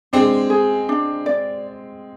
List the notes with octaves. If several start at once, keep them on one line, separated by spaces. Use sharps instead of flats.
G#3 C4 D4
G#4
D4
D5